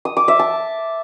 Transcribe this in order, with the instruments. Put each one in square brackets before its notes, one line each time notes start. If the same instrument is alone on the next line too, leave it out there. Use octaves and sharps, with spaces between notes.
[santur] D#6
D6
E5
A5